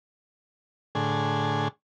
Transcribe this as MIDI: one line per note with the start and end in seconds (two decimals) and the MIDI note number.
0.95 1.68 45
0.95 1.68 50
0.95 1.68 68